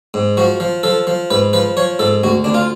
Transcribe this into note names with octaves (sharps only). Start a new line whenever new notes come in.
G#2
F3 F#4
F3
F3 A4
F3
G#2 B4
F3 B4
F3 C#5
G#2 A4
D2 F#4
D2 D4
F4